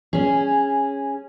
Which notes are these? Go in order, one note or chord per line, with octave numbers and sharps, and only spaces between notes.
C#4 G#4